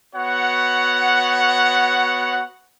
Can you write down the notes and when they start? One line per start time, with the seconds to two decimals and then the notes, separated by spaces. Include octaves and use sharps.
0.14 B3 F#4 C#5 F#5